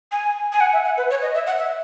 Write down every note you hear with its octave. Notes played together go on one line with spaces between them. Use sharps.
G#5
G#5
F#5
E5
F#5
B4
C#5
D#5
E5
F#5
E5